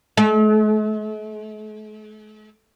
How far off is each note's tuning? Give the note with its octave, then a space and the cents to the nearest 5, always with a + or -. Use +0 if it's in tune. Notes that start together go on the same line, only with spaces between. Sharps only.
A3 -45